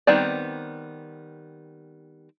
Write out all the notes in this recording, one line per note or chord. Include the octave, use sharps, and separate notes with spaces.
D#3 G3 B3 C4 D5